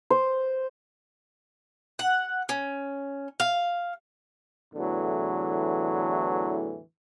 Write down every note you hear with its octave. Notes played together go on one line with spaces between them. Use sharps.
C5
F#5
C#4
F5
E2 A2 D3 E3 F#3